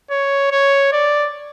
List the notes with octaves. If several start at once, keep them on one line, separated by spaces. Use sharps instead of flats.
C#5
C#5
D5